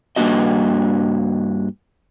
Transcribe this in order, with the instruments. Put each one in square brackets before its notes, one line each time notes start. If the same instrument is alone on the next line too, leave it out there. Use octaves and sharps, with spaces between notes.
[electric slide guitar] G2 F3 A#3 D4 F#4 D#5